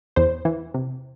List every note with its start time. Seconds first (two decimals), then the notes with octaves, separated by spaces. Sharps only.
0.16 E2 C5
0.45 E3
0.74 C3